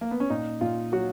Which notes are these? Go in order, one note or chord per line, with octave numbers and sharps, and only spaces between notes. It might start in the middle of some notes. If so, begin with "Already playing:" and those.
A#3
B3
C#4
A#2 D#4
A#2 F4
F#3 F#4